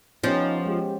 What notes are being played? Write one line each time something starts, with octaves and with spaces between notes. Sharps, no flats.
F3 B3 C#4 D#4 G4 C#5 G6 A6
G#3 G4